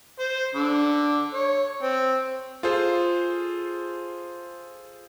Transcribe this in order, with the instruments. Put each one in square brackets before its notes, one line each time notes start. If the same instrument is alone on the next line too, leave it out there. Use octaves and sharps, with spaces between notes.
[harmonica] C5
D3
C#5
C4
[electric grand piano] F4 G#4 A4 C5